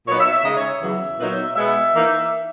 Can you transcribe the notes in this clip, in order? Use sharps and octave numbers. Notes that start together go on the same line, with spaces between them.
A#2 F#3 B3 D#4 C#5
E5
E5
C#3 G#3 D#4 D#5
C#5
E5
E2 C#3 F#3
A#2 F#3 B3 D#4
B2 G#3 B3 E5
E3 A#3 D#4